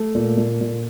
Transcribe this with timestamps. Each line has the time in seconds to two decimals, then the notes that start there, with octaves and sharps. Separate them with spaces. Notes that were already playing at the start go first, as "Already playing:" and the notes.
Already playing: A3
0.15 A#2
0.37 A#2
0.61 A#2